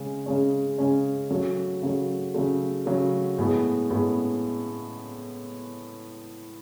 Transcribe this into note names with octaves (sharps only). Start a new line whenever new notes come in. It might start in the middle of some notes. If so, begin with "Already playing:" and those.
Already playing: C#3 G#3 C#4
C#3 G#3 C#4
C#3 G#3 C#4
C#3 F#3 A3
C#3 F#3 A3
C#3 F#3 A3
C#3 F#3 A3
A2 G#3 B3
A2 G#3 B3